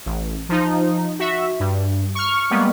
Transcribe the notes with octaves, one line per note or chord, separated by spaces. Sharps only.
A1
F3 D#4
F#4 E5
G2
C#6 F6
G3 G#3 A#3 B3